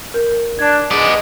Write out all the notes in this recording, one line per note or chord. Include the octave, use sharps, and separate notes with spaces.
A#4 G6
D4 G#6
G#3 B3 D5